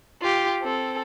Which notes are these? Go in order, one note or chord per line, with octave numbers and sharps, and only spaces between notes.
F4 G4
C4 A4